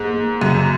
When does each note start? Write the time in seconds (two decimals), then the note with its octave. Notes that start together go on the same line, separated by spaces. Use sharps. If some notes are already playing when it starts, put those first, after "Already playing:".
Already playing: G#2 A#3 G#4
0.14 A#3
0.41 F#2 C#3